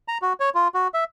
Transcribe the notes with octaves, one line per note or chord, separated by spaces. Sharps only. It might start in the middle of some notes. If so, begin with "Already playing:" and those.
A#5
F#4
C#5
F4
F#4
E5